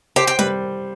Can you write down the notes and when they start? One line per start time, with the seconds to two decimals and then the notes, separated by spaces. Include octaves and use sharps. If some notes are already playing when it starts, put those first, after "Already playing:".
0.16 G4 C5
0.27 G4
0.39 G3 B4